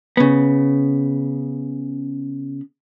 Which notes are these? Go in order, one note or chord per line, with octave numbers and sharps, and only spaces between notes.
C#3 B3